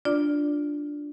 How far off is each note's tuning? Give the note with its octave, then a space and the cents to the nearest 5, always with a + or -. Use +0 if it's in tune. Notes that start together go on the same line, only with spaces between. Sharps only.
D4 +0 F4 +10 D5 -5